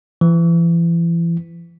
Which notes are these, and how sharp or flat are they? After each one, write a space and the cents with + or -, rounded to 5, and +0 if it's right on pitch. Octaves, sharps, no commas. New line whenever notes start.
E3 +35